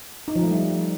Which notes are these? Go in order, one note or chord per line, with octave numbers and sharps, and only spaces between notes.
D#4
F3
A3
G3